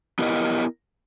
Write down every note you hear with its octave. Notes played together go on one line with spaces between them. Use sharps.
B3 E4 G4 A#4 D#5